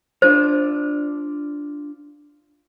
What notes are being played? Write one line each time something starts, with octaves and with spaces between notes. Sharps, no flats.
D4 F4 C5